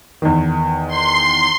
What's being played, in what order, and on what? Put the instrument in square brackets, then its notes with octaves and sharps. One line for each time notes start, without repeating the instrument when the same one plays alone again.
[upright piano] E2 D#3
[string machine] C6